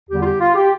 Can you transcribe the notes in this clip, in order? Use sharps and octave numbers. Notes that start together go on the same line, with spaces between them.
E2 D3 G3 G4
F4
G4
F4
G4